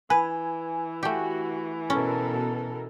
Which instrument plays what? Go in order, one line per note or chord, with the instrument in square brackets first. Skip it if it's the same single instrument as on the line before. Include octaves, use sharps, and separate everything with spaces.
[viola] E3 [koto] B4 [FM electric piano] G#5
[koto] A3 G4 [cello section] F#4
[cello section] B2 A4 A#4 [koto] C#4